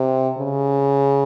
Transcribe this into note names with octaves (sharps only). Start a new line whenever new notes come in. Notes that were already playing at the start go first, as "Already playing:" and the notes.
Already playing: C3
C#3